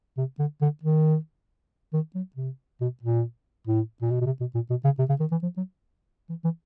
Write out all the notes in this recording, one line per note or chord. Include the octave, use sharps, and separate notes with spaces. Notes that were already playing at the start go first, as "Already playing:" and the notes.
C3
D3
D3
D#3
D#3
F#3
C3
B2
A#2
A2
A#2
B2
B2
C3
B2
A#2
B2
C#3
C3
C#3
D#3
E3
F3
F#3
E3
E3